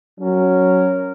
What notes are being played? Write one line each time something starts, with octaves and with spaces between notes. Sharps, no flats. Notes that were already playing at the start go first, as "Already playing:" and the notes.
F#3 C#4 F#4 A#4